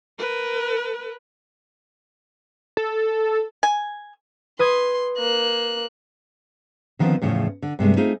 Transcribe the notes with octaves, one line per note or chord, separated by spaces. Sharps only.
A#4 B4
A4
G#5
B4 C6 D#6 G#6
A#3 F#6
D3 D#3 F3 B3 C4
E2 A2 C#3 E3 F3
D3
G2 C3 G#3 A3
A3 C4 D#4 F4 G#4